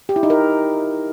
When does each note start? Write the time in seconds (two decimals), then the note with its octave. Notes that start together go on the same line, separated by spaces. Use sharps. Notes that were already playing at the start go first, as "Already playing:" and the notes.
0.09 G4
0.16 E4
0.23 D#4
0.30 A#4